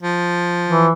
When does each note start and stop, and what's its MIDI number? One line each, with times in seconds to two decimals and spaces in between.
0.03 0.88 53
0.70 0.91 52